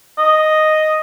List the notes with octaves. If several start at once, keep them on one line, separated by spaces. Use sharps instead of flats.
D#5